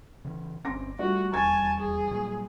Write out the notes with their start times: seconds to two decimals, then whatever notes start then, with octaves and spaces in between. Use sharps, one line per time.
0.25 C#3 E3
0.65 G1 C4 C#4 C6 D6 A#6
0.99 G3 A3 F4 F#4 D5
1.33 D#1 E2 G3 G#5 A5 C#6 G#6 A6
1.79 G#4
2.11 A#2 F#3 G3